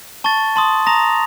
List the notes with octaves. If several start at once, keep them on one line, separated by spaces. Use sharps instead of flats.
A5 C#6 A6
A5 C6 D#6
A#5 D#6 A#6 F7